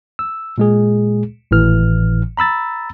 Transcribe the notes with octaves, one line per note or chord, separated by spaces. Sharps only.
E6
A#2 G#3 G#4
G#1 A2 E3 F6
A#5 B5 E6 A6